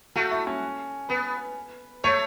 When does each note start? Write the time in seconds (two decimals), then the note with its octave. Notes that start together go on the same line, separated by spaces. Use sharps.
0.15 A3 F#4
0.31 E4
0.47 C#4
1.09 B3 B4
2.04 A3 C#5